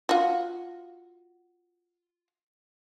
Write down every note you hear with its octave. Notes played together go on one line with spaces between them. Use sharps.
F4 F#4